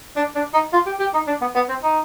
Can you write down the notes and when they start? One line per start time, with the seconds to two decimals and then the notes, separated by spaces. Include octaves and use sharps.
0.16 D4
0.35 D4
0.54 D#4
0.73 F4
0.86 G4
0.99 G4
1.14 D#4
1.27 D4
1.41 B3
1.55 B3
1.69 C4
1.83 D#4